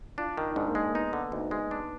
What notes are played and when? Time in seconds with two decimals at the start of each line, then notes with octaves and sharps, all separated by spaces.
0.18 D4 F4
0.37 D#3
0.50 D#4
0.56 G#2 D4
0.66 A#3
0.75 G#3
0.86 A#3
0.94 B3 D#4
1.13 D3
1.32 D2 D#4
1.51 G#3
1.71 D4